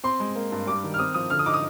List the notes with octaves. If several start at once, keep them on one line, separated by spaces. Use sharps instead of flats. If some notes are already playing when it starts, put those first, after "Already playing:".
C4 C6
G#3
A#3
G2
G3 D6
D#3
F6
C4 D#6
F3 D#6
D3 F6
D#6
D#4 D6
D#6